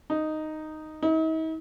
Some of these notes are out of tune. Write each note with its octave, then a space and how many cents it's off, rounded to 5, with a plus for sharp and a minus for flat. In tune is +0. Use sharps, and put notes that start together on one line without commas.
D#4 -5
D#4 +45